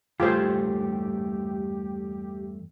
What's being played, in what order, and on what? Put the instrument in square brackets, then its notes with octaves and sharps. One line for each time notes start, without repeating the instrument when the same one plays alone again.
[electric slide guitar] E2 G2 A3 [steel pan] F4 G#4 C5 [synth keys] G4